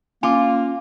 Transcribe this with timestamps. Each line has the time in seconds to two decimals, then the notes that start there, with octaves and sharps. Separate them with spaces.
0.23 A#3 C#4 F4 G#5 D6